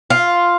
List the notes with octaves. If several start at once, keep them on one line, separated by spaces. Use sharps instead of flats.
F4